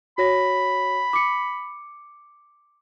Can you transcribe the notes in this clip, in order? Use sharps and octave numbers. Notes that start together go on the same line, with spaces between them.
F#4 C#5 B5 A#6
D6 C#7